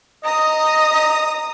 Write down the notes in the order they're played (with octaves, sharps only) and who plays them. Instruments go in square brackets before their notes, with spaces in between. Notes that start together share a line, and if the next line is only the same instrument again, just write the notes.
[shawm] D#5 [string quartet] A#5 D#6